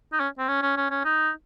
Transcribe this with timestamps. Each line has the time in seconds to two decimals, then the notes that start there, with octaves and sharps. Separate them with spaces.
0.13 D#4
0.20 C#4
0.39 C4
0.48 C#4
0.62 C#4
0.77 C#4
0.91 C#4
1.05 D#4